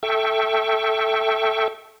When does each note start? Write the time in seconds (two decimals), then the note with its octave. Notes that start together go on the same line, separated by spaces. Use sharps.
0.03 A4 E5 G5 C#6